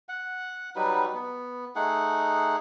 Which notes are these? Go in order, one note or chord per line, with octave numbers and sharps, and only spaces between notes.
F#5
F#3 G3 D#4 B4
B3
A3 D#4 G#4 F#5